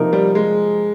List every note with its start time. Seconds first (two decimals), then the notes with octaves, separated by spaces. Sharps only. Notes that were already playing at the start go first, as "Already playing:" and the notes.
Already playing: C3 F3 A#3 D#4 A#4
0.13 G3
0.35 G#3